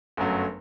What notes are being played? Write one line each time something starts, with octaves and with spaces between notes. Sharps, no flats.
G1 F#2 F#3 A3